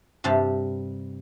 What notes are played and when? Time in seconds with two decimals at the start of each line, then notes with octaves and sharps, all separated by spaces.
0.24 G2 C3 G3 A5